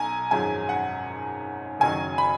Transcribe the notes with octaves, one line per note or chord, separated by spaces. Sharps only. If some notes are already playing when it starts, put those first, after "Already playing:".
Already playing: B1 G#5 A#5
G#1 F#2 F3 G#3 G#5
F#5
F#1 F#2 D#3 F#3 G#5
B5